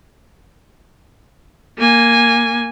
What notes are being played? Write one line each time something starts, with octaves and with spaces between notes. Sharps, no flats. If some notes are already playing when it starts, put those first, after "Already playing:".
A#3 G#5